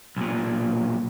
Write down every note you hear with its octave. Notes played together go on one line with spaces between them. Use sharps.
B1 A#2